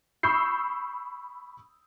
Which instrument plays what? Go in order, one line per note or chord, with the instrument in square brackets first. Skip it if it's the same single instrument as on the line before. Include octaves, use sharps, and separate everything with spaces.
[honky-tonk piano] B5 C#6 D#6 E6 G6 C7